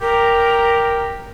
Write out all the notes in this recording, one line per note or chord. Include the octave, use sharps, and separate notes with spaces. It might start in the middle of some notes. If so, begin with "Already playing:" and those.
G4 A#4